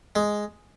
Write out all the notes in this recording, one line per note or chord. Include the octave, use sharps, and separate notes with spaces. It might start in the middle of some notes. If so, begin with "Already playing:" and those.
G#3